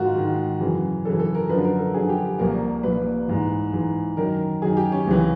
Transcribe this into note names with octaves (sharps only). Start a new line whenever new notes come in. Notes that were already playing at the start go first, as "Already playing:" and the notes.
Already playing: G#2 D#3 F4 F#4
G#2 D#3
F#2 C#3 E3
F#2 C#3 E3 A4
A4
A#4
F#2 D3 F3 B4
A#4
A4
F#2 D3 F3 G#4
G4
C2 A#2 F3 A#4
C2 A#2 F3 B4
G#2 E3
G#2 E3
F#2 D#3 A#4
F#2 D#3 G#4
G4
C#4
C#2 C3 E3